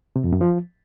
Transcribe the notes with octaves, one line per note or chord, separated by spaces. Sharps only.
C3
F2
F#2
F3